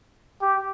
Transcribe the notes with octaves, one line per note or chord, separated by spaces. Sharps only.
G4